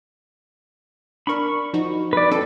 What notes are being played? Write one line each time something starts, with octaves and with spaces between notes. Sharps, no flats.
D4 A#4 B5 C#6
F3 D#4 F#4
B4 D5
C4 C#4 A4